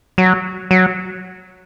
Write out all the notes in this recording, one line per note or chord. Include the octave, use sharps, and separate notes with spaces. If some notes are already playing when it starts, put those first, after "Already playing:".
F#3
F#3